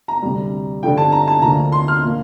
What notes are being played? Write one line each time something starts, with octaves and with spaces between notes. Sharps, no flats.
A#5
D2 C3 G3
G2 D3 F3 A3 G5
A5
A#5
A5
D2 D3 F3 A#3 A#5
C6
F6
A#2 F3 A#3